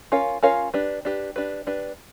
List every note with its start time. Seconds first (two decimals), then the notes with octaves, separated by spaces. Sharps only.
0.12 C#4 F4 A#4 C#5 F5
0.43 C#4 F4 A#4 C#5 F5
0.74 D4 G4 B4
1.05 D4 G4 B4
1.36 D4 G4 B4
1.67 D4 G4 B4